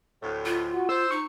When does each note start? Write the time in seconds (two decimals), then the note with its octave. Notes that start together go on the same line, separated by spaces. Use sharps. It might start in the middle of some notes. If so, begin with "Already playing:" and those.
0.22 D2 A2
0.45 F4
0.73 F#4
0.89 C5 E6
1.11 D#4 C#6